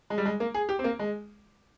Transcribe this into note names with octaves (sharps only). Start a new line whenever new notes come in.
G#3
G3
G#3
A#3
G#4
G4
C4
A#3
G#3